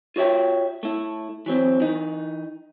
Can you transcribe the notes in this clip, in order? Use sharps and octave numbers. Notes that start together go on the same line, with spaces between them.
F4 F#4 C#5 E5 G5
A3 E4
E3 F#3 C4
E3 D#4